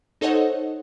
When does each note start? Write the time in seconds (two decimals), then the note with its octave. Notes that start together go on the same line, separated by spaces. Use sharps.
0.21 D#4 A4 C5 C#5 D#5 F#5